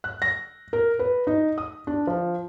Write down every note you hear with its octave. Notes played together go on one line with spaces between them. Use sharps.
F#6
A#6
A#4
B4
D#4
D#6
D4
F3